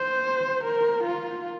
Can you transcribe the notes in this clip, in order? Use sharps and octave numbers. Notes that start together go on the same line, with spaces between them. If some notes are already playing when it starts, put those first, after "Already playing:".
Already playing: C5
A#4
F4